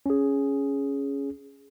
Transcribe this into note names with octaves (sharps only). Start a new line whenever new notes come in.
C#4 G#4